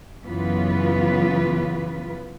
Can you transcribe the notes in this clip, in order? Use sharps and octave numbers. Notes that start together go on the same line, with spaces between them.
F#2 C#3 E3 B3 F4 B4